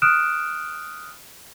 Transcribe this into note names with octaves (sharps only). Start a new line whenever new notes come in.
D#6 F6 F#6 D7 E7